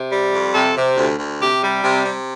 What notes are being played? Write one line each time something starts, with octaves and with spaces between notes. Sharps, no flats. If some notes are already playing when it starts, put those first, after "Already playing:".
Already playing: C3
G3
F2
C3 A4
C3
D2
D2
C3 G4
G3
C3
C3